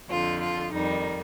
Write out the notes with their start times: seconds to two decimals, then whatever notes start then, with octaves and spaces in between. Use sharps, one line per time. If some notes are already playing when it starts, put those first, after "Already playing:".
0.11 F2 D3 F3 F4
0.41 F4
0.72 F2 D#3 G3 D#4